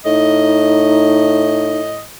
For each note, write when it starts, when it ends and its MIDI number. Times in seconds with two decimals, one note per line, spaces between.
0.06 2.07 45
0.06 1.80 63
0.06 2.02 75